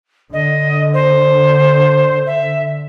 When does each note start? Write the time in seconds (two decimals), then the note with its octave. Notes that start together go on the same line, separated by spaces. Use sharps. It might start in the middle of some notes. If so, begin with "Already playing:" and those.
0.33 D3 D#5
0.93 C5
2.26 E5